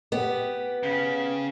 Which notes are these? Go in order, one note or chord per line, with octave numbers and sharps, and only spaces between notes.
B3 G4
C#3